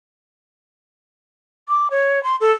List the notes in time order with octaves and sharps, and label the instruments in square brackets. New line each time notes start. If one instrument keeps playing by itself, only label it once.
[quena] D6
C#5
C6
A4